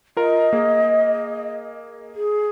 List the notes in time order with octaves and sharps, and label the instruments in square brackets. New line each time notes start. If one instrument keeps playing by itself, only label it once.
[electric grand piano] F4 A#4 [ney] D#5
[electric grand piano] A#3 G#4
[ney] G#4